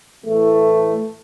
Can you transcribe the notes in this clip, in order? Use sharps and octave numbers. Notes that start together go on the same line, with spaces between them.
A2 E3 A3